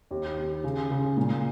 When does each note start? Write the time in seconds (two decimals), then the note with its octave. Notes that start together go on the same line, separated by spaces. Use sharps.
0.11 D#2
0.38 D#2
0.64 C#3
0.91 C#3
1.17 A#2